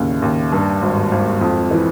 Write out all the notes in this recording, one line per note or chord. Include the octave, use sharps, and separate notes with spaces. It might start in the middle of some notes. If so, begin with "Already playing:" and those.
Already playing: D#2 A2 C#3
D#2
G2
G#1
G#1
F2
E3